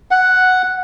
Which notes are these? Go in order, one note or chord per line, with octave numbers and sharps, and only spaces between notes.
F#5